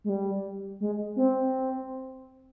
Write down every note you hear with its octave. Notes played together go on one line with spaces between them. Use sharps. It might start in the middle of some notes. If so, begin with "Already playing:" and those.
G#3
G3
G#3
C4